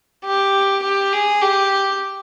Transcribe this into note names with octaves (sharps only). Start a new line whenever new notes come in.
G4
G4
G#4
G4